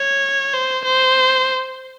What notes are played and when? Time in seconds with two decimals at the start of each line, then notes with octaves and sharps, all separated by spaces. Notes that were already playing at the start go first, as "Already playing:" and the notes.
Already playing: C#5
0.53 C5
0.85 C5